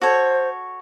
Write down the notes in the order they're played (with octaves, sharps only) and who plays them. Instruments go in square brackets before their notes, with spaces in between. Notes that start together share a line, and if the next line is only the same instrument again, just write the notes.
[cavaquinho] F#4 A4 C#5 [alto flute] C5